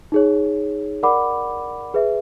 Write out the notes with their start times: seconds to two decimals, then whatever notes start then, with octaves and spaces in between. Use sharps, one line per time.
0.12 D#4 G#4 C#5
1.03 A#4 D5 F#5 B5 D6
1.94 G#4 B4 E5